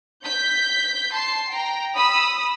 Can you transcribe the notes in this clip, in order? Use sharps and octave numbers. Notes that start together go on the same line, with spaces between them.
G6 B6
A5 C6 C7
G5 A#5
B5 D#6 E6